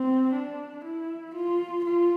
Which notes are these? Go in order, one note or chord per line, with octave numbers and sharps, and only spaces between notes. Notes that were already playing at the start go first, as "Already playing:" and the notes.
Already playing: C4
D4
E4
F4
F4